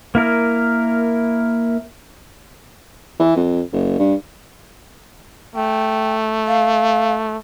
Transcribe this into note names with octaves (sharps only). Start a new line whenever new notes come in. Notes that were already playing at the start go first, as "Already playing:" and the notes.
A#3 E4 A#4
E3
F2
F#1
G2
A3 G5
F5